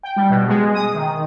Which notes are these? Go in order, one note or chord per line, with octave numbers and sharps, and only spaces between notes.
G5
G3
B2
G#3
D#6
D#3